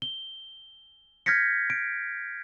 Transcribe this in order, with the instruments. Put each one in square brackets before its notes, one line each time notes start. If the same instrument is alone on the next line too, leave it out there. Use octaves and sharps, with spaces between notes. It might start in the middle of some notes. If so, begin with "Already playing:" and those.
[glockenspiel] G7
F6 G6 G#6 A#6 B6 C#7
D7